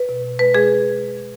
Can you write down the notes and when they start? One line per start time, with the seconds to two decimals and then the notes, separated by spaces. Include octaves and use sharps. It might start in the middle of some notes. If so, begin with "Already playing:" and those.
Already playing: B4
0.09 B2
0.24 B2
0.39 G#3 B4
0.54 G#3 G#4